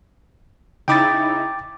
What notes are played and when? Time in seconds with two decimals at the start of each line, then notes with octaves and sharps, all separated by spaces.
0.88 C#3 D#4 E4 G5 D6 A6